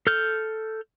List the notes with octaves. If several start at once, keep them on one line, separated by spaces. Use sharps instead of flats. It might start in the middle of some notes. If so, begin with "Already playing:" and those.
A4 F6 G6